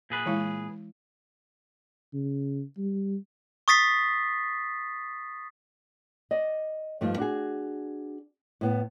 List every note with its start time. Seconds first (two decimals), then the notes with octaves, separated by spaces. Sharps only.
0.10 A#2 G#4 B4
0.26 E3 G#3 E4
2.14 C#3
2.78 G3
3.68 C#6 D#6 A6 B6 C7
6.31 D5 D#5
7.01 G2 F3 A3 D#4
7.18 D4 F#4 G#4
8.61 A2 B3